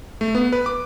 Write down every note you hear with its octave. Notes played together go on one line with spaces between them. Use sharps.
A3
B3
B4
D6